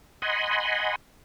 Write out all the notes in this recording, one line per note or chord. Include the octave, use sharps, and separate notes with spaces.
D#5 F#5 G#5 B5 C6